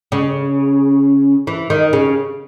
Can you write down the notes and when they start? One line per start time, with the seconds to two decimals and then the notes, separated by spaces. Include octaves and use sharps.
0.12 C#3
1.47 E3
1.70 D#3
1.93 C#3